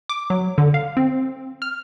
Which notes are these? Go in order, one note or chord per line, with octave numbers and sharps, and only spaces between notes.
D6
F#3
D3
F5
C4
F6